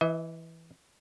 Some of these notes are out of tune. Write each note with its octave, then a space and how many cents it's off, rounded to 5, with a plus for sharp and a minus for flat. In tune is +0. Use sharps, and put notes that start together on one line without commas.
E3 +0 D#5 +45